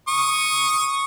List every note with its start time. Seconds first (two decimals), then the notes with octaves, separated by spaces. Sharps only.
0.08 C#6 D#6